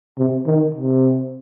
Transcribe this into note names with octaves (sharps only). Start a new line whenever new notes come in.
C3
D#3
C3